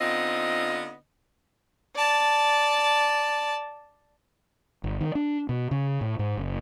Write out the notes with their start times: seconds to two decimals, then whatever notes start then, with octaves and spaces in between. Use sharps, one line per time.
0.01 D3 B3 C4 D#4 F4 D#5
1.95 D5 A5
4.84 G1
5.01 D#3
5.15 D4
5.49 B2
5.71 C#3
6.01 A2
6.19 G#2
6.37 F#1